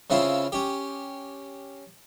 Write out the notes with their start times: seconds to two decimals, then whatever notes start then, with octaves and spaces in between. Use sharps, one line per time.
0.10 C#3 C4 C#4 E4 F4
0.52 C#4 G4